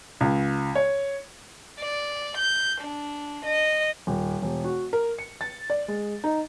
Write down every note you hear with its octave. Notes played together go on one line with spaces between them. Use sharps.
C#2
C#5
D5
G6
D4
D#5
D#1
E1
F#4
A#4
C#7
A6
D5
G#3
D#4